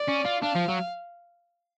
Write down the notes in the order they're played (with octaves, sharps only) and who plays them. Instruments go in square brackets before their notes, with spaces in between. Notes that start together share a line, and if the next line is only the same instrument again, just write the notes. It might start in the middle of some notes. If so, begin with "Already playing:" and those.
Already playing: [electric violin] D5
[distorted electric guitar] C#4
F4
[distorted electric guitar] D4 [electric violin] F5
[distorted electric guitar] F3
F#3